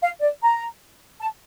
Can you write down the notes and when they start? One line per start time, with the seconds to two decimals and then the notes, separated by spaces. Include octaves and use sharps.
0.02 F5
0.21 D5
0.42 A#5
1.20 A5